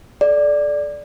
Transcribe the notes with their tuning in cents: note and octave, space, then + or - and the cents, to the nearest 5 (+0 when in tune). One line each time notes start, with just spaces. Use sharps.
A4 -30 D5 +0